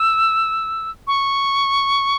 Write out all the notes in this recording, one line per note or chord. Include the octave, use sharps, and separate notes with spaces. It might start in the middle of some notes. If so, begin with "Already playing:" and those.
Already playing: E6
C#6